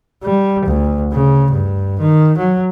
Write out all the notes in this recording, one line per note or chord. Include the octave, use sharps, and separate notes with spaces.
G3
D2
C#3
G2
D#3
F#3